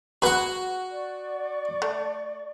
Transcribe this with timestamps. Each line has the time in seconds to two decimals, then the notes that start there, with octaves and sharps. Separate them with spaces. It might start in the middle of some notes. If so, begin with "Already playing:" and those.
0.22 F#4 G#4 B4 F#5
0.90 D5 C#6
1.82 A3